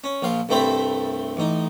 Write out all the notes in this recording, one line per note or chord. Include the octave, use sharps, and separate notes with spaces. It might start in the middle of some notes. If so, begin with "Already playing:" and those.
C#4
A#1 F3 F5
C2 G2 A3 C4 C5 B5
A1 D#4